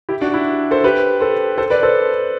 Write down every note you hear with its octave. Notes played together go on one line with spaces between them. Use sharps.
E4 G4
D4 F#4
E4
A4 C5
G4 B4
A4 C5
A4 C5
B4 D5
A4 C5